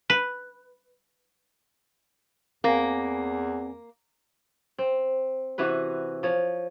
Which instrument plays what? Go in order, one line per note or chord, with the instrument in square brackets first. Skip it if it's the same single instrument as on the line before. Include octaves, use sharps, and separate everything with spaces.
[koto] B4
[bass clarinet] E2 [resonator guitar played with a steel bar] A#3 [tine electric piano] C4 G#5
[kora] C4
C3 E3 F#4 B4
F3 C#5